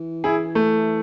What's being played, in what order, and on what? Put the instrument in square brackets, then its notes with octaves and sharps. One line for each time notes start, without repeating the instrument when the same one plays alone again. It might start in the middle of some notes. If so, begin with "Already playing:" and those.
Already playing: [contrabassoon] E3
[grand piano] E4 G#4
A3